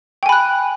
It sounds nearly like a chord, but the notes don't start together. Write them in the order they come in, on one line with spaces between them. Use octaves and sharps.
G5 G#5 B5 F#6